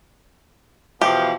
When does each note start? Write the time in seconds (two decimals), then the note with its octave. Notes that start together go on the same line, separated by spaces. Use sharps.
1.01 B2 E3 F3 G4